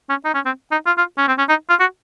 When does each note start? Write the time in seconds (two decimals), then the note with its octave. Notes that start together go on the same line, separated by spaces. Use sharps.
0.10 C#4
0.25 D#4
0.35 C#4
0.46 C4
0.72 D#4
0.87 F4
0.98 F4
1.18 C#4
1.28 C4
1.39 C#4
1.49 D#4
1.70 F4
1.80 F#4